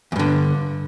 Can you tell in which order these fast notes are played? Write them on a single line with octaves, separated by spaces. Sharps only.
E2 G2 D3